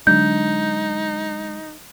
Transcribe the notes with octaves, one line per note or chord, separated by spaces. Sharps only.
D3 F#3 G#3 D4 D#4 G6